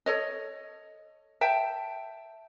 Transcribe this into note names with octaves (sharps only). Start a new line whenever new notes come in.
A4 C#5 D#5
E5 G5 A5